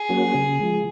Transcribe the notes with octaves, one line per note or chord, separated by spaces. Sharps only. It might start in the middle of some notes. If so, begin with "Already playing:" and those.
Already playing: G#4
F#3 A#3 C#4 F#4
C#3
F3 G#3